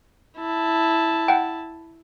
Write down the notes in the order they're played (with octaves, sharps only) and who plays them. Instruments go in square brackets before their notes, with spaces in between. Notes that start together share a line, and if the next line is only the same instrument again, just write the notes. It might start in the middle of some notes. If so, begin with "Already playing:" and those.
[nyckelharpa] E4 A5
[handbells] F#5 G5